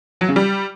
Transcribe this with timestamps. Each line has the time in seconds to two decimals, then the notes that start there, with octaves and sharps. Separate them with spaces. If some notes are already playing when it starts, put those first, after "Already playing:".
0.21 F#3
0.28 C#3
0.36 G3